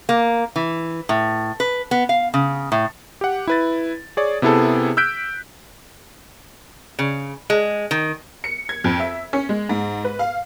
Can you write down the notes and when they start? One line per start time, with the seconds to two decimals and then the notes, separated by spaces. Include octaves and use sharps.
0.09 A#3
0.56 E3
1.09 A2
1.60 B4
1.91 B3
2.09 F5
2.34 C#3
2.72 A2
3.21 G4 F#5
3.47 E4 B4 A6
4.17 G#4 C#5 D5
4.42 C3 B3 E4 G#4 A4
4.97 E6 F#6 G6 B6 D7
6.99 C#3
7.50 G#3
7.91 D#3
8.44 C#7
8.69 G#6
8.84 F2
9.00 E5
9.33 C#4
9.49 G#3
9.69 G#2
10.04 B4
10.19 F5